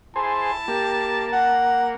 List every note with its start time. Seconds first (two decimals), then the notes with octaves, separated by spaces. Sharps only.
0.16 E4 G#4 C5 A5
0.68 A#3 G4
1.33 F#5